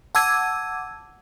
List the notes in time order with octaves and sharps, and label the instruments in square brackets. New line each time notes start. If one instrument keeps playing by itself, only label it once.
[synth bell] F#5 A5 D6 E6 G#6 D#7